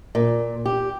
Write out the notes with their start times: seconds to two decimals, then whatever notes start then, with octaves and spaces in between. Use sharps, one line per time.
0.15 A#2
0.66 G4